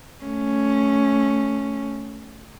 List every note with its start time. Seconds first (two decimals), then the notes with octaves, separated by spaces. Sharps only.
0.24 A3 C#4